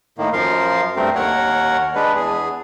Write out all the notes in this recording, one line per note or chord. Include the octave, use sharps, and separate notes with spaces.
A2 D#3 A#3
F#2 F3 A#4 F5 C6
G2 A3 C4 A#4
D#2 A#4 C#5 F#5
G#3 D4 B4
E2 G#4